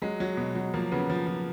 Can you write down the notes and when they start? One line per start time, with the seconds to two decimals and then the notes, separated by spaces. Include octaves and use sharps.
0.02 F#3 G#3
0.20 F#3
0.37 B2
0.55 F#3
0.74 F3 A#3
0.92 C#3 B3
1.10 F3
1.27 F3